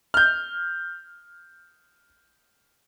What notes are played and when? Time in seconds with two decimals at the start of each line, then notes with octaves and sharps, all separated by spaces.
0.14 F6 G6